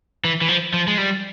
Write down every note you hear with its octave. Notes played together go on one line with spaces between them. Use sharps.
E3
E3
F3
F3
G#3
G3